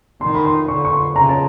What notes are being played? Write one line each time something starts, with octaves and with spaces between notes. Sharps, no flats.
D#3 C6
B5
C6
D3 C#6
C#6
C6
C#3 A#5
A5